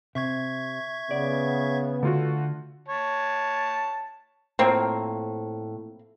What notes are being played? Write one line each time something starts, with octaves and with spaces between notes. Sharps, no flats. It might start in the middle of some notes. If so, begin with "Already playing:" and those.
C3 E5 C#6 G#6
C#3 B3 D5
D3 A3 F4 F#4
C#5 A5
A2 F3 A#3 C4